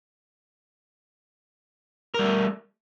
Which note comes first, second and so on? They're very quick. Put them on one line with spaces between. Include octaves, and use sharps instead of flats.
A#4 G3 A3